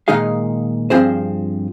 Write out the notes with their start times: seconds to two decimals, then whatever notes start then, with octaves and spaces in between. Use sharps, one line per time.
0.08 A#2 D#3 G#3 D#4 G#4 F5
0.90 G2 F3 C4 G#4 C5